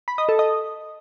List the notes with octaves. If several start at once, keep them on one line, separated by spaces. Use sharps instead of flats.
B5
D#5
A4
D#5